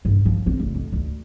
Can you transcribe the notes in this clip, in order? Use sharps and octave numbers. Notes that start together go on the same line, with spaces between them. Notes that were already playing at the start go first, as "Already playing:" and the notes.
G2
F3
C4
F1
F2
D2